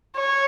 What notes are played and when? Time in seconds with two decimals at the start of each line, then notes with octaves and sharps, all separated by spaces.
0.16 C#5